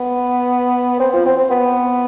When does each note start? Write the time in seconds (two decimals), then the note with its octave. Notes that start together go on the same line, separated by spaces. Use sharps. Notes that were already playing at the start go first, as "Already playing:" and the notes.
Already playing: B3
1.00 C4
1.13 F3
1.25 C4
1.37 C4
1.50 B3